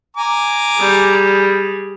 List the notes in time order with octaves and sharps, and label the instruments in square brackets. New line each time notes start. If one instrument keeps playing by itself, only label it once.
[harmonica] G#5 A#5 D6
[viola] G3 G#4